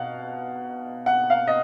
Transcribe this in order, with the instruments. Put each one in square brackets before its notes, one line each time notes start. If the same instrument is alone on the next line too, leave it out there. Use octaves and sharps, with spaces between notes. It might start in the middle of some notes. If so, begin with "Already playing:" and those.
Already playing: [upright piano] B2 F5 F#5
F#5
F5
D#5